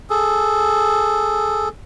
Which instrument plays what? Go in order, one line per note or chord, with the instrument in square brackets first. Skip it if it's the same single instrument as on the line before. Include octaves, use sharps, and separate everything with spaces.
[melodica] G#4 A4